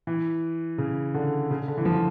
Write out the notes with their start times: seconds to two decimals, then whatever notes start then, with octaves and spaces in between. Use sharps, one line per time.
0.07 E3
0.78 C#3
1.14 D3
1.51 C#3
1.68 D3
1.78 E3
1.85 F3